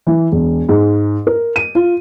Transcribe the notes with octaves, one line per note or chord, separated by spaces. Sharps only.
E3
E1
G#2
A#4
D#7
F4